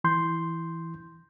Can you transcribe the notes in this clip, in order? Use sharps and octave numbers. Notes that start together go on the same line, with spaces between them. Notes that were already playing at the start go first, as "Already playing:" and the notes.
E3 C6 G6